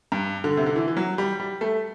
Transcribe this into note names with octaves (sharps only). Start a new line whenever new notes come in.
G2
D3
C3
D3
E3
E3
F#3
G3
G3
A3